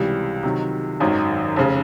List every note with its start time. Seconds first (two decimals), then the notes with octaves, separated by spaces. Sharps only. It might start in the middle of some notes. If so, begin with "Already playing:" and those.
Already playing: C#2 C3 E3 G3
0.43 C3 D#3 F#3
1.00 G#1 F#2 D#3 F#3
1.56 F1 C#3